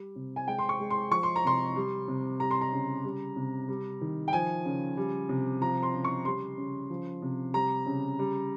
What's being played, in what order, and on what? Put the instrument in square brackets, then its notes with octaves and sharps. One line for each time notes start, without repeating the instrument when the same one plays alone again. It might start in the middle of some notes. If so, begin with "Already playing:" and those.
Already playing: [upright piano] G3
C3
G#5
G#3 G5
C6
C#6
G#3
C6
F3 C#6
C6
A#5
C3 C6
G3
C3
G3 A#5
C6
A#5
C#3
G3
C3
G3
D#3
G5
F3 G#5
C#3
G3
C3
F3 A#5
C6
C#3
C#6
G3 C6
C#3
F3
C3
G3 A#5
C#3
G3